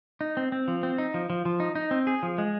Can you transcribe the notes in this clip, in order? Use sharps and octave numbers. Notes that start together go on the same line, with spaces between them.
D#4
C4
C4
F3
C4
D#4
F3
F3
F3
D#4
D#4
C4
G#4
F3
G#3